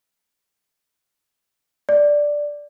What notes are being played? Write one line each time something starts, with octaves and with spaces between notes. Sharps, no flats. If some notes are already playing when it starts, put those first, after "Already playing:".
D5